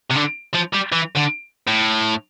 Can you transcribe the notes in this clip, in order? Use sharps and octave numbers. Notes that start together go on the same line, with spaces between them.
C3
D3
F3
G3
E3
D3
A2